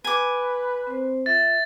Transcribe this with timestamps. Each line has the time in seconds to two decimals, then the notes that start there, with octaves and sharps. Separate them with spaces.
0.04 B4 G#5 D6
0.87 C4 C5
1.26 F4 E5 A6